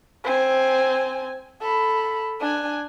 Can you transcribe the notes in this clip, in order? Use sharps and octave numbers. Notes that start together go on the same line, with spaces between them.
C4 G#5
A4 B5
D4 G#5